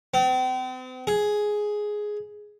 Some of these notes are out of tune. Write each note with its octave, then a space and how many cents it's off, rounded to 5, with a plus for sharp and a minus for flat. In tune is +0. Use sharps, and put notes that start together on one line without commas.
C4 -40
G#4 +5